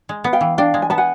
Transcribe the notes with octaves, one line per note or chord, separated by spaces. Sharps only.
G#3
B3
F5 G5
E3
D4 F5 G5
G#3
G#5
B3 A5
F#5 G#5